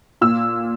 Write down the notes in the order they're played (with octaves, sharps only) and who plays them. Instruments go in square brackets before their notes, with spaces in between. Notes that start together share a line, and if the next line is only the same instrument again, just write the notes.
[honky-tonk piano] A#2 E6